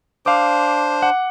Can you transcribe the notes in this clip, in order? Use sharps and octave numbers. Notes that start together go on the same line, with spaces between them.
D4 C5 F5 D6
F#5